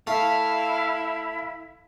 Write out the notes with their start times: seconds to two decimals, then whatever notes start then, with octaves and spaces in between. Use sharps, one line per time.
0.07 A3 E4 F5